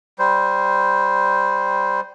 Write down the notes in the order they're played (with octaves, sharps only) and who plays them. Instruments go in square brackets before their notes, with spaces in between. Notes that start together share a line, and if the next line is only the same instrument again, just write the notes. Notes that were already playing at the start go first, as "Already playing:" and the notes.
[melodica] G3 C5